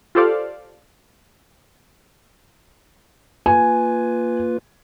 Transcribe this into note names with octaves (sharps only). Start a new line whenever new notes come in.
F4 G4 A4 C5 D5 F5
A#3 F4 B4 G#5